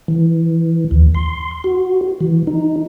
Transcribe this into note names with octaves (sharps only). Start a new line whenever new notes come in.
E3
D#2
C6
F#4
E3
D#4